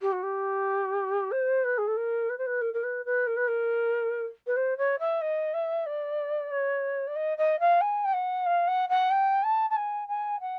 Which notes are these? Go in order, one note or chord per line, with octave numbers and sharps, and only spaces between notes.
G4
F#4
G4
C5
B4
G#4
A4
A#4
B4
C5
B4
A#4
A#4
B4
B4
A#4
B4
A#4
B4
C5
C#5
E5
D#5
E5
D5
C#5
D5
D#5
D#5
F5
G#5
G5
F#5
F5
F#5
F#5
G5
A5
A5
G#5
G#5
F#5